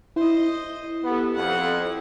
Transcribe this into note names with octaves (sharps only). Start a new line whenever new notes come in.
E4 C5 D#5
B3 G4 A4
F2 F#5